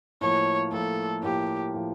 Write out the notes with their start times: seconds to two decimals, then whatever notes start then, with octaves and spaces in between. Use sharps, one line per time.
0.21 A2 F3 A#3 C#5
0.72 A2 F3 A#3 A4
1.23 A2 F3 A#3 G4
1.74 A2 F3